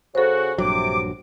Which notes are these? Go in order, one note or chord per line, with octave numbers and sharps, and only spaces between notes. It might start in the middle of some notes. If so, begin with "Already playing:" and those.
C#3 F#4 A4 C5
A#1 G2 C3 F#3 D6